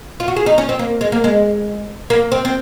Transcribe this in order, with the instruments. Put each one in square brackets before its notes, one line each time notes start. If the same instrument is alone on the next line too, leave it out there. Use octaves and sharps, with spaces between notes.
[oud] F4
F#4
G#4
D#4
C#4
C4
A#3
G#3
A#3
G#3
A#3
C4
C4